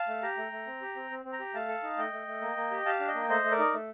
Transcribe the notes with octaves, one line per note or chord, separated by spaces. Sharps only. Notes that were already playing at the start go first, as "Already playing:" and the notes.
Already playing: F5 A5
A3
G4 G5 A#5
A3
A3
C4
G4
C4
C4
C4
G5 A#5
G4
A3 F5 A5
A4
D#4
A3 D#5 G5
A3
A3
A#3
A#3
G4
G4 F5 A5
D4
D#5 G5
A#3
A3 C5 D#5
A3
A#4 D5
D#4
A3